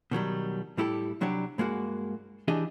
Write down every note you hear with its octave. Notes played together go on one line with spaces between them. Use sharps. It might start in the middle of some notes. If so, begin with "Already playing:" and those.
B2 D#3 F#3 G3
A2 G3 E4 G4 A4
C2 F#3 D4 G4 C#5
G2 G#3 A#3 F#4
E3 D4 G4 G#4 D#5